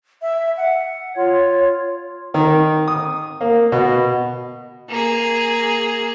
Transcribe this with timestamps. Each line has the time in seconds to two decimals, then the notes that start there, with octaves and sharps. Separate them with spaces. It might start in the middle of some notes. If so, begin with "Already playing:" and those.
0.22 E5
0.57 F#5
1.16 F4 C#5
2.34 D#3
2.88 D#6
3.41 A#3
3.72 B2
4.89 A#3 G#4